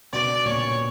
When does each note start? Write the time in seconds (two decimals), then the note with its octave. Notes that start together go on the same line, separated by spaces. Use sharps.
0.13 B2 D5
0.45 A#2 C#5